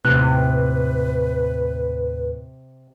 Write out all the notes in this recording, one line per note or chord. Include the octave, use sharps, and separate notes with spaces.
D#2 A2 C3 B4 F#6